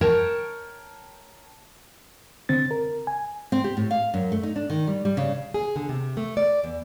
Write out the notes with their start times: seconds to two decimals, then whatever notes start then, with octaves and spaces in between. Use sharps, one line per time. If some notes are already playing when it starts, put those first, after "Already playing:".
0.01 A#4 C#5 G5 A5
2.49 D3 C4 A6
2.71 A#4
3.07 G#5
3.52 C4
3.64 G4
3.77 A2
3.91 F5
4.14 F#2
4.32 A3
4.43 D#4
4.56 D4
4.70 D#3
4.87 G3
5.05 G3
5.17 C#3
5.54 G#4
5.76 D3
5.89 C3
6.17 A3
6.37 D5
6.64 E2